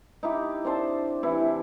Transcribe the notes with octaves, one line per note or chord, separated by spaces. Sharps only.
D#4 E4 G4
C4 D4 C5 A5
C3 E3 E4